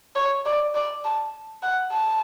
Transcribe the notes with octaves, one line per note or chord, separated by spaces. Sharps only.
C#5
D5
D5
A5
F#5
A5